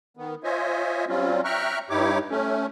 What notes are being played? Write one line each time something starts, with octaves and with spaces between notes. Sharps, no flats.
D#3 B3
F4 C5 C#5 D#5 E5 G#5
F#3 G3 C4 C#4 F4
E5 G5 A#5 C#6 F6 F#6
G2 D#4 E4 G4 C#5 D6
A3 C#4